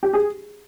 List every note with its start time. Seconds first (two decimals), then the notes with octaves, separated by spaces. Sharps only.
0.03 G4
0.13 G#4